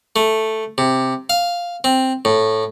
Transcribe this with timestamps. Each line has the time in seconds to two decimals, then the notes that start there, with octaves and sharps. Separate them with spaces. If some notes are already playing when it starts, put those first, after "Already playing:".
0.16 A3
0.78 C3
1.30 F5
1.84 C4
2.25 A2